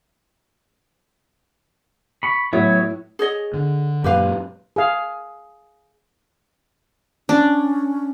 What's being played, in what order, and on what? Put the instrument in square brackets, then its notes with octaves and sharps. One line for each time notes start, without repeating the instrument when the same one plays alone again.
[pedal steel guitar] B5 C#6
[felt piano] A2 E4 [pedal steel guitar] F#3 B3 C#5
[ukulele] G#4 C#5 D#5
[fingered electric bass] D3
[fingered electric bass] F#2 A#2 [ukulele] G4 B4 F5
[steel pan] G#4 F5
[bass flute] C#4 [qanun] D4